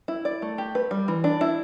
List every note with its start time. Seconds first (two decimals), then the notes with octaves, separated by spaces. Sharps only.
0.08 E4
0.25 D5
0.42 A3
0.58 G4
0.75 B4
0.91 G3
1.08 E3
1.24 D4
1.41 E4